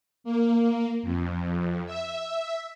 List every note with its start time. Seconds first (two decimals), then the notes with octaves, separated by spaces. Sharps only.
0.24 A#3
1.03 F2
1.86 E5